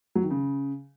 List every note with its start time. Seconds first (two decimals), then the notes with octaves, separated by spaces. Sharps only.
0.15 F#3
0.23 D#3
0.30 C#3